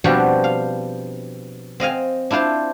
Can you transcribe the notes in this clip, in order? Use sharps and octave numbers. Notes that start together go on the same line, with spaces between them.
B2 F3 G3 C4 D4 F#4
F5
C4 D#5 F5 G#5
D4 E4 F4 C5 A5